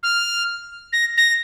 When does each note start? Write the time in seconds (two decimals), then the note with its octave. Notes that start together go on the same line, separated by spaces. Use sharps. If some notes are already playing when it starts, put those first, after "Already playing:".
0.03 F6
0.93 A#6
1.17 A#6